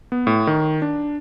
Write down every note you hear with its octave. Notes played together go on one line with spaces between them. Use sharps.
B3
A2
D#3
D4